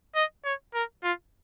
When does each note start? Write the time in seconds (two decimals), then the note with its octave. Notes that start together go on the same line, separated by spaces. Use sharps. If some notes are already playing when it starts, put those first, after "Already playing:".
0.15 D#5
0.45 C#5
0.74 A#4
1.04 F4